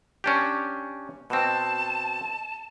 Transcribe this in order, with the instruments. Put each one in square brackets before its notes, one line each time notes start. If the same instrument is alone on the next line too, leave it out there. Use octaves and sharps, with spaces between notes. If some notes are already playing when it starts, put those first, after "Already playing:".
[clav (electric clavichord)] C#4 D4 G4
[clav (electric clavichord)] B2 C4 [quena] A5